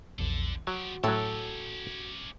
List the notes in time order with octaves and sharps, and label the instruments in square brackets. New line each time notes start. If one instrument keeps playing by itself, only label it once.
[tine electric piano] A#1 E2 [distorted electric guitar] D3 A4
[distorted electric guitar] F3 G4 [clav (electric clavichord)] F#3 [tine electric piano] F#4
[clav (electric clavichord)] A2 F#3 [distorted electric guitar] C#4 G4 [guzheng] A4